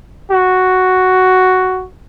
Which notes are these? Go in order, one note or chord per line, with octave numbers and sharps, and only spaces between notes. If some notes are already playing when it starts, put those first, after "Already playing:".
F#4